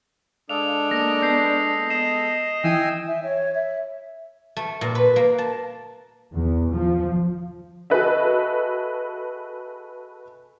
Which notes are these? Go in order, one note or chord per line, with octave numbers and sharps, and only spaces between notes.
G#3 D4 A4 F5 F7
A#3 D#6 A#6
B3 G6 C7
D#5 C7 E7
E3 E4 G5 G#5 E6 D#7
E5
C#5
E5
A3
A#2
B4
A#3
A5
E2
F3
F#4 G#4 A4 B4 D#5 E5